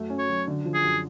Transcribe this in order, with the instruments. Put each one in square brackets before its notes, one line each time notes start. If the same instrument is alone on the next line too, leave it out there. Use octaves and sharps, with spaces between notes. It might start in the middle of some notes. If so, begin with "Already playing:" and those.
Already playing: [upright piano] F#2 A3
C#4
[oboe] C#5
[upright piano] F#3
D3
F3
[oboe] G#4
[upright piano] F#2